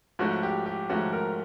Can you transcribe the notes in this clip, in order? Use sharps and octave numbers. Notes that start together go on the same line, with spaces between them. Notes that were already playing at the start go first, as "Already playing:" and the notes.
G#2 F3 A3 C#4 F#4
G4
G4
G#2 F3 A3 C#4 F#4
A#4